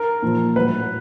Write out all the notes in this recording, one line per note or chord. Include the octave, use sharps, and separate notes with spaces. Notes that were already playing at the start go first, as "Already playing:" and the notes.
Already playing: A#4
A#2 F3
A2 F#3 B4